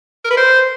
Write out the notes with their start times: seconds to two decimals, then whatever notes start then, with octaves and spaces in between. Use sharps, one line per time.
0.24 A#4
0.31 B4
0.37 C5